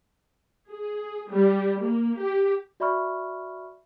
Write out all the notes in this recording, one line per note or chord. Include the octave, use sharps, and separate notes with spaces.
G#4
G3
A#3
G4
F#4 D5 E5 B5 C#6 F6